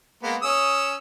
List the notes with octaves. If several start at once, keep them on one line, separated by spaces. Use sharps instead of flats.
G#3 A#3 B3
C#4 D#6 E6